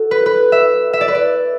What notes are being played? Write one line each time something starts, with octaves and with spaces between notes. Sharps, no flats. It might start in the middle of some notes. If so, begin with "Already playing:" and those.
Already playing: F#4 A4
B4
B4
E5
E5
D5
B4
D5